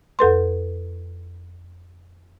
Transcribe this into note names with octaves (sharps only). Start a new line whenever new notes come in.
F2 A4 B4 C6